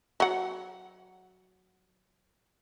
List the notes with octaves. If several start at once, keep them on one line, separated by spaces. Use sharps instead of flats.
F#3 F#5